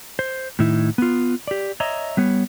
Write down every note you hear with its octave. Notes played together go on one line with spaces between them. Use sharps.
C5
A2 D#3 D#4 E4
B3 F4
G4 D5
C#5 D#5 E5 A#5
G3 B3 C#5